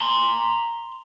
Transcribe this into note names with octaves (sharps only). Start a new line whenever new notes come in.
A#5 C6